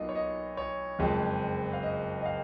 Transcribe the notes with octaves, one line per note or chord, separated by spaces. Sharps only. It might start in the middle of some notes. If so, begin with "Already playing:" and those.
Already playing: B1 B2 A#3 F4 D#5
C#5
D#5
C#5
F#1 F2 F3 G#3
F5
D#5
D#5
F5